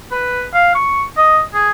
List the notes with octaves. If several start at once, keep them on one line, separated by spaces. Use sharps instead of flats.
B4
F5
C#6
D#5
G#4